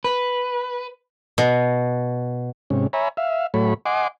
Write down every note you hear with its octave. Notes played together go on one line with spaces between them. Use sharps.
B4
B2
G#2 C3 C#4
C#5 E5 G#5 A#5 B5
E5 F5
A2 F#3 A3 C#5 B5
D#5 F#5 G#5 C6 D6